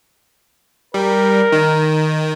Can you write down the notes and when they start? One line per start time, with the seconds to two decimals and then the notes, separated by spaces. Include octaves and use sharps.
0.94 G3 A#4
1.52 D#3